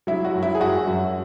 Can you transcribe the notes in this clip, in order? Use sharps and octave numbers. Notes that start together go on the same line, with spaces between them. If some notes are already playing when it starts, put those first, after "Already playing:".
F#3 E4
F#4
F#2
E4
G#4
F#2 F#4
F#2